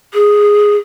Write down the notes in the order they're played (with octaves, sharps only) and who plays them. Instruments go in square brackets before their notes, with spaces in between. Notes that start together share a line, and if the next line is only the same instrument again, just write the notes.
[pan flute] G#4